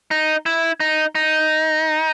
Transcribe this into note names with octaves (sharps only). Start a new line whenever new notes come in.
D#4
E4
D#4
D#4